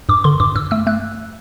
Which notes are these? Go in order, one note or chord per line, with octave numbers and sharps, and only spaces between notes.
G2 D6
D3 C6
G2 D6
G2 E6
A3 E6
A3 F#6